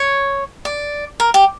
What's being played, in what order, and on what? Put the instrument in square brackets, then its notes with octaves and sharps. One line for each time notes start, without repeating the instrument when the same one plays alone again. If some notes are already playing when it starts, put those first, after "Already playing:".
Already playing: [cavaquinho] C#5
D5
A#4
G4